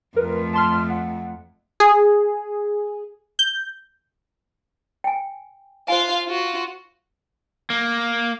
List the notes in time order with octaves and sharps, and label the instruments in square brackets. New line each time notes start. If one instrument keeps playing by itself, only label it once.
[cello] F2 A3 [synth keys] A#4 B4
[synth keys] A5 C6 F6
F#5
[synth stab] G#4
G6
[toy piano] G5 G#5
[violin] F4 F5 [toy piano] C5 G#5
[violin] F4 F#4
[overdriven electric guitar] A#3